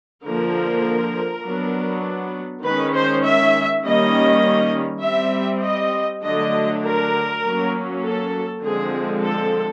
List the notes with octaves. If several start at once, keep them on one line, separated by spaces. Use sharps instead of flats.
D3 F3 A#3 A#4
F#3 B3 D4
D#3 G#3 C#4 B4
C5
E5
D#3 G3 A#3 C#4 D#5
G3 C4 E5
D#5
D3 F#3 A3 D4 D#5
A#4
F#3 A#3 C#4
A4
D3 F3 G#3 C4 G#4
A4